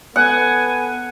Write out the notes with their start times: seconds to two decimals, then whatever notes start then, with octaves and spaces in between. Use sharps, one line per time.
0.16 B3 A4 F#5 G#5